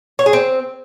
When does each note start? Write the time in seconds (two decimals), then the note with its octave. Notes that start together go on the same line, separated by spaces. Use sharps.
0.19 C#5
0.26 G#4
0.33 C4